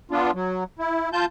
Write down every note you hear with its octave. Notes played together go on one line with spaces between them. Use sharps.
B3 D4 F4
F#3
E4
F4 A5 G6